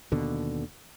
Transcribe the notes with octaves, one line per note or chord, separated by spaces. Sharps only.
D#2 B2 D3